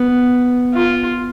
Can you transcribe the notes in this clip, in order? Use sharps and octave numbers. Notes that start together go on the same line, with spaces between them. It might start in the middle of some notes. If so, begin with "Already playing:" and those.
Already playing: B3
F4